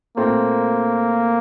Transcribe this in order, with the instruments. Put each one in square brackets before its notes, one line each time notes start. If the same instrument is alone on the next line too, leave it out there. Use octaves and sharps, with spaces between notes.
[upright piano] A#2 A3 C4 F4 [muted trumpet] A#3